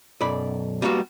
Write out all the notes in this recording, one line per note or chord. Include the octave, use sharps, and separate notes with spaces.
B1 F#2 D5 B5
G3 A#3 B3 D#4 F#4